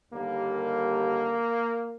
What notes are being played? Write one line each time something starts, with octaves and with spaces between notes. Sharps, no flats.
D#2 D3 G3 A#3